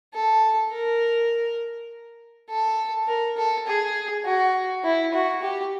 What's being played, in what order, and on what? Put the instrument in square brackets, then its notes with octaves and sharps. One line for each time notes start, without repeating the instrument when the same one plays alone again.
[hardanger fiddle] A4
A#4
A4
A#4
A4
G#4
F#4
E4
F#4
G4